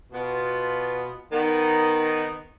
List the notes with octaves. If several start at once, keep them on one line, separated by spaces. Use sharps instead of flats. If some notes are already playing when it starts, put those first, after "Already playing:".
B2 B3 F4
D#3 B3 D#4